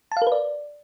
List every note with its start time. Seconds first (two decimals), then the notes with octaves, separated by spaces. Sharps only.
0.12 A5
0.17 F5
0.22 A#4
0.27 B4
0.32 D5